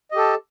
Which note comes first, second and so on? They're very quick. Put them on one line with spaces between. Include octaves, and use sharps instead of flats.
D#5 G4 A4 A5